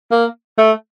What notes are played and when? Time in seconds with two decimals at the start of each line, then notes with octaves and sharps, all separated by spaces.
0.11 A#3
0.58 A3